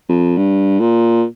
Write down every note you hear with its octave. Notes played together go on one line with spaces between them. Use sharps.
F2
G2
A#2